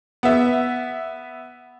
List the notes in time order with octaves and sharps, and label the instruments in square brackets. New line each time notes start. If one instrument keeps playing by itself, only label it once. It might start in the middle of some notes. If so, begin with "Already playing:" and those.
[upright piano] B3 E5